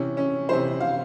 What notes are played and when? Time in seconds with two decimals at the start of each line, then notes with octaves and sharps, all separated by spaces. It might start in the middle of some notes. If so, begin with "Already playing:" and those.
Already playing: C3 E3 C#4
0.17 C#4
0.49 C3 E3 C5
0.80 F5